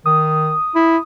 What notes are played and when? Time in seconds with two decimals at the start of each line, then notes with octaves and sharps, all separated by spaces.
0.06 D#3 D#6
0.75 E4